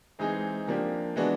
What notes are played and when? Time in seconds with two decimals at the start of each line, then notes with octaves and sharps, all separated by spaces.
0.19 E3 G#3 C4 D#4 G#4
0.68 F3 A#3 D4 G4
1.16 E3 G#3 B3 D4 F#4